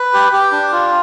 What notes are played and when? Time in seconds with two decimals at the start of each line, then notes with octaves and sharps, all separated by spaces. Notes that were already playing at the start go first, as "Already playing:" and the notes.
Already playing: B4
0.13 G4
0.32 G4
0.52 D4
0.72 F4